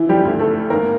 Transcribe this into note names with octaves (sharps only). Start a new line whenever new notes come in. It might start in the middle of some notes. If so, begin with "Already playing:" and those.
Already playing: E3 F3 E4
G3 G4
D2
A3 A4
G#1 A#3 A#4